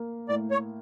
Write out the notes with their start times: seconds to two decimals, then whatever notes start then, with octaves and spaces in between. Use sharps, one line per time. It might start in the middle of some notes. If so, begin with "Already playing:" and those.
Already playing: A#3
0.28 A2 D5
0.51 C#5